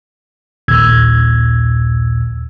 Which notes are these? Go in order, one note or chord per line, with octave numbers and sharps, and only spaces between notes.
A#1 D#2 A#2 E6 G#6